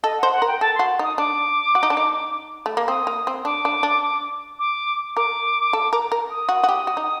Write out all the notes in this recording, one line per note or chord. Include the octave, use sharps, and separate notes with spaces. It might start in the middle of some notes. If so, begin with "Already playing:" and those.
A4 D#5
C5 F#5
F#5
A#4
G5
A4 A5
F#4 C6
D#4 D#6
D4 D6
F#4
D#4
D4
D#4
A3
A#3
C4 D#6
A#3
C4
D4 D6
D4
D4
D6
A#4 D6
A4
A#4
A#4
D#6
F#4
F#4
G4
F#4
D#4